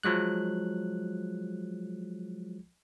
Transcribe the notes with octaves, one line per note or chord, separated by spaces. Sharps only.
F3 F#3 G#3 F#6